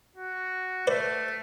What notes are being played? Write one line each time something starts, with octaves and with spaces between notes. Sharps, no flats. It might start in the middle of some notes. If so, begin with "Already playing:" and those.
F#4
A3 B4 C5 D5